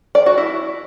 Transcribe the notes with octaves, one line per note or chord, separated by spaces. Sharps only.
D5
F#4
E4